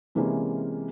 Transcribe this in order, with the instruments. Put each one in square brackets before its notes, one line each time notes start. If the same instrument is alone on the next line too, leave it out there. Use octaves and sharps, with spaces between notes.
[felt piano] C3 E3 G#3 A#3 C#4